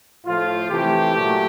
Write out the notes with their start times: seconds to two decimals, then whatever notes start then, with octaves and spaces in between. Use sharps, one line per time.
0.25 A2 F3 A3 F4
0.70 C3 E3 A3 G4
1.14 A#2 F#3 A3